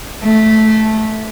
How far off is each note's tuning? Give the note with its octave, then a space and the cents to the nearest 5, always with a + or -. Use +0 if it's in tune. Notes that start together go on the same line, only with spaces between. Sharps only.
A3 -10